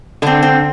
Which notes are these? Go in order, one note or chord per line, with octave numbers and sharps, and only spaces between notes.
D3 C4 D4
C4